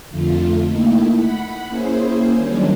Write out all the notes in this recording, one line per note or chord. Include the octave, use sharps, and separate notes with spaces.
F2 D3 A3 F4
A3 A#3 D#4 E4
F#5 B5
A#3 C#4 E4 G#4 C5
D#3 F#3 G3 C#4 D4